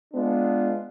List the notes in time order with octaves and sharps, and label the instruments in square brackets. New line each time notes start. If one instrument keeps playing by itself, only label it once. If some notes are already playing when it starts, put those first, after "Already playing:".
[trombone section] G#3 B3 D4 F4